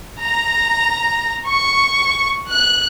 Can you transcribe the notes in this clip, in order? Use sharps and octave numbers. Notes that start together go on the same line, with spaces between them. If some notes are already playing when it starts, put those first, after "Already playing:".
A#5
C#6
F#6